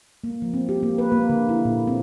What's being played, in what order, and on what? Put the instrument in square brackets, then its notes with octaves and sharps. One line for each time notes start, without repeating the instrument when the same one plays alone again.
[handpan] A#3
F3
C4
G4
A#3
B4
A#3
D3
E4
A#2
C4